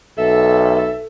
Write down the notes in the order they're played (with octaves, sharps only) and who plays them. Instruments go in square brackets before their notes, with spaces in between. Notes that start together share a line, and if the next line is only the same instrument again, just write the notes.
[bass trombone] B1 [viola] A4 [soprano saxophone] E5